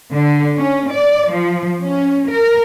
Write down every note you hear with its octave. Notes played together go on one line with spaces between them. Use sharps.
D3
C#4
D5
F3
C#4
A#4